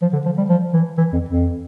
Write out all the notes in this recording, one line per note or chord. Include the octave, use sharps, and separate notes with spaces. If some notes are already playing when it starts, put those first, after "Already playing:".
F3
D3
F3
G3
F3
E3
E3
F2
F2